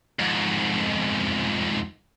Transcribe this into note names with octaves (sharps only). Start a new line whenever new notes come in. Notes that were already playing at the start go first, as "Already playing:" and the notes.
F2 G#2